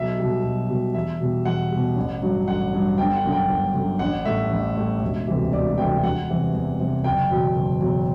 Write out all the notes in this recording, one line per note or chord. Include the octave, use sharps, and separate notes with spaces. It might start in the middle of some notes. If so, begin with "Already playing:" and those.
Already playing: B1 E5
B2 G3
B1
B2 G3
E2 E5
B2 G3
E2 F#5
G3
B2
A1
G2 F#3
A1 F#5
G2 F#3
G1 G5
F#5
F#2 D3
G5
G1
F#2 D3
A1 F#5
A2 G3 E5
A1
A2 G3
E1
D2 C3 E3 G3
E1 D5
D2 C3 E3 G3 G5
E2 F#5
C3 E3 G3
E2
C3 E3 G3
F#1 G5
E2 B2 F#3
F#1
E2 B2 F#3